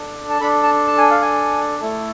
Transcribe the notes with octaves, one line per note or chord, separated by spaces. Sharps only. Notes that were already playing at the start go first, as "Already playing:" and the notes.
Already playing: D4 A4
A5
D4 A4 B5
A5
A5
G#5
F5
G#5
A3 E4 A4